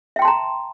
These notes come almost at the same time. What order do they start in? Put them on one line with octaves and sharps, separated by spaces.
E5 G5 C6 A5 A#5